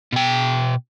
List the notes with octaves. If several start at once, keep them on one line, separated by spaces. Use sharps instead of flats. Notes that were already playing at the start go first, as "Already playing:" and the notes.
B2 G5